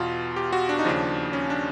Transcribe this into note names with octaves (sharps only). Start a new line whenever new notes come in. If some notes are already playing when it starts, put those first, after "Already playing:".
Already playing: E2 B2 F4
G4
F#4
D4
D#4
D#2 C#3 F3 D4
C#4
D4